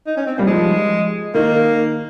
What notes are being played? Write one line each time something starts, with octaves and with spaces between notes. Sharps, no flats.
D#4
C#4
C4
G3 A#3
F3 G#3
D#3 A#3